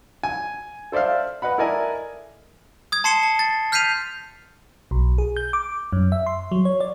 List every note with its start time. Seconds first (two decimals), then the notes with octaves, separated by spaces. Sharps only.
0.23 G#5
0.92 A4 C5 D5 E5 F5
1.42 B4 D#5 F#5 B5
1.58 E4 A4 A#4 D5 D#5 G#5
2.92 D#6 G#6
3.04 A5 C6 C7 C#7 E7 G7
3.23 A5
3.39 A6
3.72 F6 G6 B6 C7 D#7 F7
4.91 B1
5.18 G#4
5.37 G6
5.53 D6
5.93 F#2
6.12 E5
6.26 C6
6.52 F#3
6.65 C#5
6.80 D5